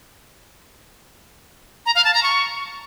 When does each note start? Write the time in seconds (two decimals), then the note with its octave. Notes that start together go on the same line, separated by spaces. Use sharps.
1.86 A#5
1.95 F5
2.05 A5
2.14 A#5
2.23 C#6